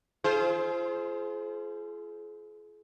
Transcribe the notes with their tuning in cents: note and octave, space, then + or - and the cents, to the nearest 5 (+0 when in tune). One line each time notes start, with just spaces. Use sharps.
F4 -35 G#4 +40 C5 +0